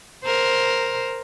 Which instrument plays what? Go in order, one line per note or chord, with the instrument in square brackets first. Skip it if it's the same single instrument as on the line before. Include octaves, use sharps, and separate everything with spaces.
[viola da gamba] A#4 C5